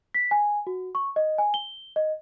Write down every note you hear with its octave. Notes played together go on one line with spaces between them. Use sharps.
B6
G#5
F#4
C#6
D#5
G#5
G7
D#5